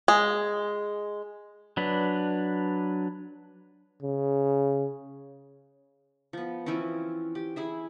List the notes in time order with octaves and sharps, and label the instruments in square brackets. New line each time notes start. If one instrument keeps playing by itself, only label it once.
[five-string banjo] G#3
[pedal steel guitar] F#3 D4 B4
[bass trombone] C#3
[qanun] F3 B3
E3 F3 C4 C#4
G4
E4 G#4 E5